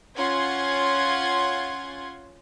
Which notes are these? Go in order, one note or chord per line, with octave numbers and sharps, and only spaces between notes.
C#4 F4 F#5 C6 G#6